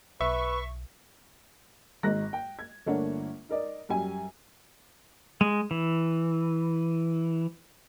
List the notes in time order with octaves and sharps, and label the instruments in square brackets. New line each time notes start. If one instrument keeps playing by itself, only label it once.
[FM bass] B1 [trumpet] B4 [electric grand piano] E5 [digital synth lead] C#6
[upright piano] G#1 G#2 G#3 A#5 F#6 A#6
G5
G#6
G1 A3 A#3 D4 C#5 F#5
D#4 A#4 D5 D#5
F#2 G3 G#5
[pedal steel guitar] G#3
E3